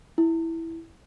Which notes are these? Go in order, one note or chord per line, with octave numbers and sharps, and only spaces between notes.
E4